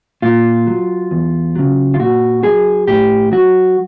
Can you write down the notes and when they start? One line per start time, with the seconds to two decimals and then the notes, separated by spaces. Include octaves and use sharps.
0.22 A#2 F4
0.67 F#3
1.11 E2
1.55 C#3 F#3
1.94 F4
1.99 A#2 F#4
2.43 F#3 G#4
2.87 A2 G4
3.32 F#3 F#4